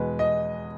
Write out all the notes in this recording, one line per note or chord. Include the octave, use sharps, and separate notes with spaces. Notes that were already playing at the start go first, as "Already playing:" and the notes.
Already playing: E2 B2 G#3 B4
D#5